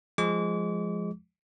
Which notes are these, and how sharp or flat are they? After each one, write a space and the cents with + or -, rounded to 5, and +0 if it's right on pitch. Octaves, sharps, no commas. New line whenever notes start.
F3 +0 G#3 +0 D6 -40